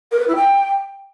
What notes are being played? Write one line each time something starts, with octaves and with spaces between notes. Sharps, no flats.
A#4
B4
E4
G5